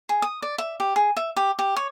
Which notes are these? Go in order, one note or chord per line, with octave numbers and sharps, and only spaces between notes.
G#4
D#6
D5
E5
G4
G#4
E5
G4
G4
C#5